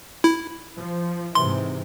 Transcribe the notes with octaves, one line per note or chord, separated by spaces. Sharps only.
E4
F3
G#2 C3 E3 C6